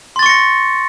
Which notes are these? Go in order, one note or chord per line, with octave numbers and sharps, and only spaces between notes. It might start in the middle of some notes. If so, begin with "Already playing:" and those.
C6 C#6 A6 A#6 C#7